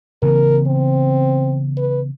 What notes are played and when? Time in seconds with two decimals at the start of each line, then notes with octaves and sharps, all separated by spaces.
0.22 C#3 E3 B3 A#4
0.67 C4
1.77 B4